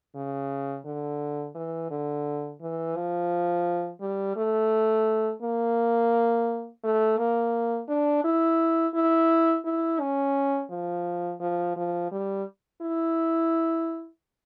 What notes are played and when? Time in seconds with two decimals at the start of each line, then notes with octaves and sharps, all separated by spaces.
0.15 C#3
0.85 D3
1.55 E3
1.91 D3
2.61 E3
2.96 F3
4.01 G3
4.37 A3
5.42 A#3
6.84 A3
7.18 A#3
7.89 D4
8.24 E4
8.94 E4
9.65 E4
10.00 C#4
10.70 F3
11.40 F3
11.76 F3
12.12 G3
12.82 E4